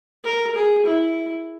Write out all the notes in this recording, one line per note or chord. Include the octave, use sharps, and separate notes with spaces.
A#4
G#4
E4